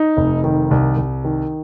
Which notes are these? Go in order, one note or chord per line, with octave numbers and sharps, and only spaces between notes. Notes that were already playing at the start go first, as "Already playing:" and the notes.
Already playing: D#4
F1
D#3
C2
C2
D#3